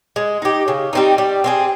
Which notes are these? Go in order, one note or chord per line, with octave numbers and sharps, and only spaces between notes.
G#3
D#4 G4
C#3
G3 C4 D#4
G3
C4 F4 G#4